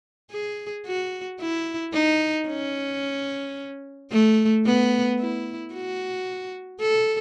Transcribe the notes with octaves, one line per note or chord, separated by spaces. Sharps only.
G#4
F#4
E4
D#4
C#4
A3
B3
E4
F#4
A4